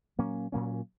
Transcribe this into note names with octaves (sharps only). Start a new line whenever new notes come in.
A#2 F#3 A#3 C#4
A#2 F#3 A#3 C#4